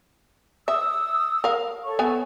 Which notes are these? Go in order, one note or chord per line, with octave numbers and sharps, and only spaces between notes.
E5 D#6 E6
A#4 F5
A4 C#5 C#6
B3 E5 G#5